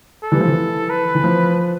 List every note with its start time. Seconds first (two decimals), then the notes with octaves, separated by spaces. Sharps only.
0.23 A4
0.32 E3 G3
0.40 F3
0.48 E3
0.90 B4
1.15 E3
1.24 F3